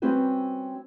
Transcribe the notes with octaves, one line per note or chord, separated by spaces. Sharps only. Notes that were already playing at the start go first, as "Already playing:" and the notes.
G3 C4 C#4 F#4 B4 C5